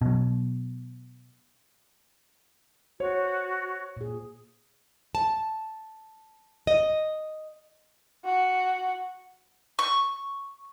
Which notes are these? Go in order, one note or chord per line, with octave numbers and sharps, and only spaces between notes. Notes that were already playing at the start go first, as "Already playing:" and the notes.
B2 F#3
F#4 C5 C#5
A#2 G#4
A5
D#5
F#4
C#6